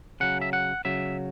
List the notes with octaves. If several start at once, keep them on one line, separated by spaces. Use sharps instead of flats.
C#3 F#3 F#5
E5
F#5
C#3 F#3 E5